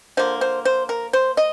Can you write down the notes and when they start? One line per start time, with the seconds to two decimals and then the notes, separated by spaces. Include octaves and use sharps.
0.17 D3 F3 A#3 C5
0.41 C5
0.65 C5
0.89 A#4
1.13 C5
1.37 D#5